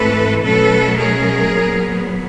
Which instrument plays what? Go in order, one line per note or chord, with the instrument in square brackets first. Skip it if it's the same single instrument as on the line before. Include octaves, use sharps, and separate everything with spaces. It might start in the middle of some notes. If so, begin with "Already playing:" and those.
Already playing: [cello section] G#2 E3 A3 C4 A4 B4
B2 F#3 A3 C#4 A4 B4
G#4 A#4
A#2 F#3 B3